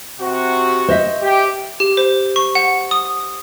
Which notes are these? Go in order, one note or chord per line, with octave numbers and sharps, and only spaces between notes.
C3 F#4
C5 D#5 E5
G4
G4
C5
C#6
F#5
D#6